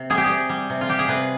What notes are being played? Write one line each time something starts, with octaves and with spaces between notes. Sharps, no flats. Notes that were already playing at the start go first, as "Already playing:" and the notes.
Already playing: C3
G3 G#4
G4
C3 G#4
G3
C3
F4
G3 G4
G#4
C3 B4